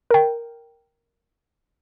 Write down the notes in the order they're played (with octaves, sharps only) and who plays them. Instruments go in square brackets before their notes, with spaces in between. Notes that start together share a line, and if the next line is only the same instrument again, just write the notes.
[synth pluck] A#4 G5